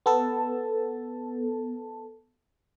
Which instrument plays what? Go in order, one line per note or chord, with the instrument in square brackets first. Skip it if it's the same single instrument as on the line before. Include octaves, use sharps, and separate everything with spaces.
[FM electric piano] B3 A4 A5